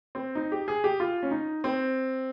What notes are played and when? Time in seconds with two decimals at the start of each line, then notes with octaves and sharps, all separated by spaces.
0.15 C4
0.35 D#4
0.52 G4
0.68 G#4
0.84 G4
1.00 F4
1.23 C#4
1.31 D#4
1.64 C4